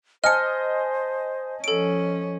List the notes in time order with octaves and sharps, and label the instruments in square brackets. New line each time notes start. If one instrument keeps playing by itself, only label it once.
[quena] C5 [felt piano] D#5 G#5 A5 [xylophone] F6 C#7
[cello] F3 C#4 [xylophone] A4 D7